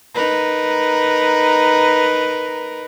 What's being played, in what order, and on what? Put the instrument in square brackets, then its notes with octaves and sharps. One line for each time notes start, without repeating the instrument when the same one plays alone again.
[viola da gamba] D#4 A#4 B4